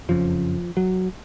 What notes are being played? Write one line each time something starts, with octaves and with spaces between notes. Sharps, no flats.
F#1 F2 C#3 F3
F#3